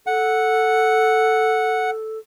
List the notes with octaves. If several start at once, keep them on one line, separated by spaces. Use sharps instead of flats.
A4 F#5